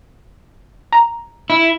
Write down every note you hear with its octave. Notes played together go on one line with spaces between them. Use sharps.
A#5
E4